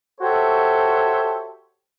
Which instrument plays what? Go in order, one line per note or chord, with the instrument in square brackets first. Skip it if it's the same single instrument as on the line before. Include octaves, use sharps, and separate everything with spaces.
[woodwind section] F#4 G4 A4 C5 C#5 E5